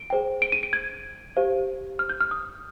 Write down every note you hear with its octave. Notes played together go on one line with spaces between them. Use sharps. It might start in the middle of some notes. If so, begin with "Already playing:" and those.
Already playing: D7
G#4 C5 G5
D7
D#7
D7
G#6
G4 C5 F5
F6
G6
F6
D#6